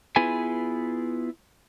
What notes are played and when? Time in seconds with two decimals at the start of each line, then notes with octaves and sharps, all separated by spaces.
0.16 B3 E4 F4 G#4 B4 G#5